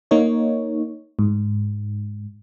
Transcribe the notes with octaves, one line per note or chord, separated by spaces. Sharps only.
A#3 D#4 C#5
G#2